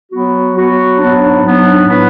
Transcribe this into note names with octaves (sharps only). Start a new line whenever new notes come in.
F#3 B3 F#4
F#3 B3 F#4
G#2 F#3 B3 D4
G#2 F#3 B3 D4
A2 F#3 B3 E4 B4